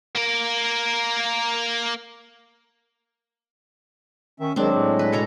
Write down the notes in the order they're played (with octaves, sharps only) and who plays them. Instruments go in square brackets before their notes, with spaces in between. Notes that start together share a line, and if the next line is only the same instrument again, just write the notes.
[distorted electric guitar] A#3 A#4
[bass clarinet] D#3 [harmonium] C#4 E5
[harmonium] D#3 G#3 [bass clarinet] F#3 [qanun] C4 D4
[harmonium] A2 G#3
[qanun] B4
[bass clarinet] B2 [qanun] A4 C#5 A#5